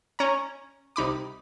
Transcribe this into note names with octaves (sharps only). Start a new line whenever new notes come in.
C#4 A#5
C2 D#4 B5 D6